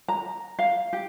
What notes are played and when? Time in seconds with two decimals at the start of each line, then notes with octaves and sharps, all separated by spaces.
0.08 A#5
0.59 F5
0.93 G4